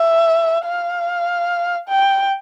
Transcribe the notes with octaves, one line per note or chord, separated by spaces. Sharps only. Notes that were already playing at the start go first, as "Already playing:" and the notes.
Already playing: E5
F5
G5